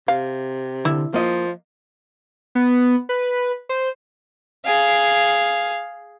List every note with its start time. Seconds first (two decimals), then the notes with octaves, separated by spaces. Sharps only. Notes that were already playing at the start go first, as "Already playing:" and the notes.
0.08 C3 F5
0.85 D3 E4
1.14 F3 A#3 D#5
2.55 B3
3.09 B4
3.69 C5
4.66 G#4 F5